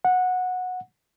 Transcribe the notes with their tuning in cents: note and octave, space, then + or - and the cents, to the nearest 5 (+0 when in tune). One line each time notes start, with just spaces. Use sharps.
F#5 -15